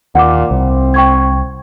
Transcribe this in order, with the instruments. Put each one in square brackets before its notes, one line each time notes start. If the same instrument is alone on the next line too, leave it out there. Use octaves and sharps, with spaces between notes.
[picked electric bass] D#2 [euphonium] A#2 [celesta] F#5 D6
[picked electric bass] C2 [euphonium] C4
[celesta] G5 C#6 G#6